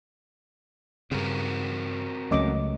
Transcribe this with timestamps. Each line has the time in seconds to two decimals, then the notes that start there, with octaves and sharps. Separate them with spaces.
1.11 G2 C#3 C4 F#4 A#4
2.31 C#2 F#3 A3 C#4 D#5 D6